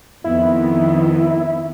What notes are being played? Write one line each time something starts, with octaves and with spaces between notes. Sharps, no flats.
F2 D#3 B3 E4